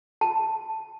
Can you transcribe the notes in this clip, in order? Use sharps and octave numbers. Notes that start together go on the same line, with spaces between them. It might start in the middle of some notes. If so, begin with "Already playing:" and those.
A5